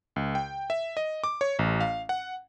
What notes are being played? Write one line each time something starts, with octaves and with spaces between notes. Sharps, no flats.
C#2
G5
E5
D#5
D6
C#5
A1
F5
F#5